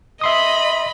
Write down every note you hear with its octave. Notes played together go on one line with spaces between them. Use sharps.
D#5 E5 B5 C6 D#6